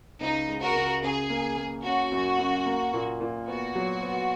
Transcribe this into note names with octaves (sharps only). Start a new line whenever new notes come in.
C#2 D#4
G#3
F#4 A#4
C#2
C#3 G#4
A#3
A#3
C#4 F#4
F#2
F#2
A#3
A#2
A#2
B3 F#4
F#3
B3